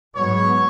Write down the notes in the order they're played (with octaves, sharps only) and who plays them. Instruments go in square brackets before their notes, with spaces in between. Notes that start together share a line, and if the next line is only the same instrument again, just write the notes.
[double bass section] G#2 F#3 B3 [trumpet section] C#5